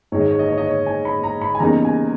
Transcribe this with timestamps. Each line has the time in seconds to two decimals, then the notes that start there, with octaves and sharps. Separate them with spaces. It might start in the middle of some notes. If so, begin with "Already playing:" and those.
0.12 G#2 D#3 G#3 C#5
0.21 D#5
0.31 C#5
0.39 D#5
0.49 C#5
0.58 D#5
0.67 C#5
0.86 G#5
1.05 B5
1.23 A#5
1.42 B5
1.55 G#5
1.60 E2 C#3 G3 A#3 D#4 A#5
1.85 G#5